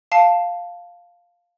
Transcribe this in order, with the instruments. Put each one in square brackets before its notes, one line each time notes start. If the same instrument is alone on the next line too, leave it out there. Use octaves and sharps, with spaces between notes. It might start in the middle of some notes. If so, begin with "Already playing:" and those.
[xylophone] F5 A5 C7